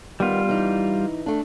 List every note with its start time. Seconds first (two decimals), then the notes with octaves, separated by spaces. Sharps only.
0.20 D#3 G3 B3 F4
0.49 E3 D#4
1.26 A3 D4